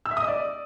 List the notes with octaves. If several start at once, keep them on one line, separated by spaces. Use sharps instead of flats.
E6
E5
D#6
D#5
D5